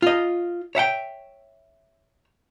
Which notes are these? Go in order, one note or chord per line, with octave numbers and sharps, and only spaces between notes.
F4 D#5
C#5 E5 F#5 G5